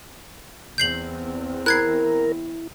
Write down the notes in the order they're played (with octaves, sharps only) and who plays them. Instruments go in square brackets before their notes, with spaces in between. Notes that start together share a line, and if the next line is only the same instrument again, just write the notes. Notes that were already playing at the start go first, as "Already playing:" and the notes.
[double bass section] E2 C4 [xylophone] G6 C7 F#7
[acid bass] E4 [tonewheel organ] A#4 [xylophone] F#6 G#6 C7